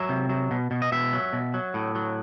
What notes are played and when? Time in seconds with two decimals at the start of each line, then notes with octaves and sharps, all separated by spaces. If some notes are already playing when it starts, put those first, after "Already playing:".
Already playing: F#3 E5
0.09 C3
0.29 F#3
0.51 B2
0.71 B2
0.82 D#5
0.92 B2 E5
1.13 F#3
1.33 B2
1.54 F#3
1.74 A2
1.95 F#3